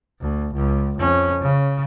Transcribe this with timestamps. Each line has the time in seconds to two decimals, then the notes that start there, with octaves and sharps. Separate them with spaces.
0.20 D2
0.54 C#2
0.98 F2 C#4
1.42 C#3